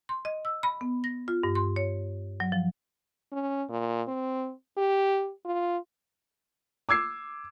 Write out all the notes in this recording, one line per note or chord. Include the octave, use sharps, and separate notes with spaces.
C6
D#5
E6
B5
B3
A#6
F4
G2
C6
C#5
F#3
F3
C#4
A#2
C4
G4
F4
D6 E6 G#6 C7